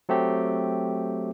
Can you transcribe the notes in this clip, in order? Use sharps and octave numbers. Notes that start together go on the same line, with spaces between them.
F#3 A3 C4 G4